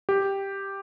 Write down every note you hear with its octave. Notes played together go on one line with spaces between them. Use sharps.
G4